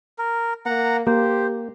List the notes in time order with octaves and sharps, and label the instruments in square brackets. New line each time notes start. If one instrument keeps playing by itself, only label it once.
[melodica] A#4
[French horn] A#3 [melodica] F#5 A#5
[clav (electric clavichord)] A#3 [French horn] G4 [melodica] C5